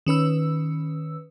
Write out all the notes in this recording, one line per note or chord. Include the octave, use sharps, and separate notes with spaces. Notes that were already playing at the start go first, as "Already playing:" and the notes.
D#3 C#4 B4 E6